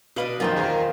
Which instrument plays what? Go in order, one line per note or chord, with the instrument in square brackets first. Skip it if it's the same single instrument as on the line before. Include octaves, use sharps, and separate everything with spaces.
[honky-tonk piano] B2 F5 F#7 [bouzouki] D4 B4 D#5
[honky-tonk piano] F#2 A#2 F3 [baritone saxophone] D#3 [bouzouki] F4 C5 G5
[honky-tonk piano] E2 G#4 A#4